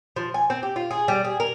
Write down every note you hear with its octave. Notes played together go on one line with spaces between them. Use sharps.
F3
G#5
C4
G4
F4
G#4
G3
G#4
A#4